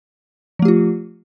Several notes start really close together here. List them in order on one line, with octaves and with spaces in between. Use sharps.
F3 A3 G4 F4